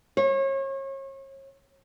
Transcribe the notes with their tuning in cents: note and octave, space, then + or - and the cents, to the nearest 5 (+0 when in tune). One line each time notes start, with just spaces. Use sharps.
C#5 -35